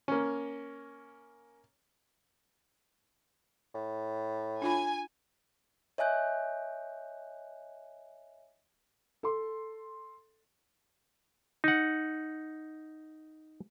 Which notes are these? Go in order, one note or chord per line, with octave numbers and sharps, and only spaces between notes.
A#3 C#4
A2
D4 F4 G#5 B5
C#5 D#5 E5 G#5 F#6 G6
A4 C6
D#4 F#5